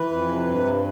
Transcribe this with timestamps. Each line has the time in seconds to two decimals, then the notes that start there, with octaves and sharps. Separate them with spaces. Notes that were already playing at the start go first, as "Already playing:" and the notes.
Already playing: E3 B4
0.10 F2
0.28 C3
0.47 G2
0.64 G2